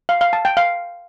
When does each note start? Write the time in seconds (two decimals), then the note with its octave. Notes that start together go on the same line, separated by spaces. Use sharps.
0.09 F5
0.21 F5
0.33 A5
0.45 G5
0.57 F5